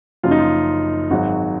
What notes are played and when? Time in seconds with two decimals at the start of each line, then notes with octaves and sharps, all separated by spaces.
0.23 F#1 F#2 F3 F4
0.31 D#4
0.39 F4
1.11 G#1 G#2 F#3 F#4